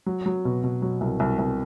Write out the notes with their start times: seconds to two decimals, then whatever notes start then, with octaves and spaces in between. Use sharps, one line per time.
0.06 F#3
0.26 F#3
0.45 B2
0.64 B2
0.82 F#3
1.01 C2
1.20 C2
1.39 C2